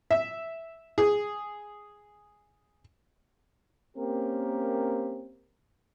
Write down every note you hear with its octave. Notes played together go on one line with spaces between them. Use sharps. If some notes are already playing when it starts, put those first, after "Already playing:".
E5
G#4
A#3 C4 C#4 G4 A#4